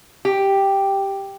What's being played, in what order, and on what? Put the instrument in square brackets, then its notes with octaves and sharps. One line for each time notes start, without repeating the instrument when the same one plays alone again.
[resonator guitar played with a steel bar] G4